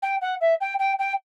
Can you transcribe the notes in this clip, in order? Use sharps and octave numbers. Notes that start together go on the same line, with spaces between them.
G5
F#5
E5
G5
G5
G5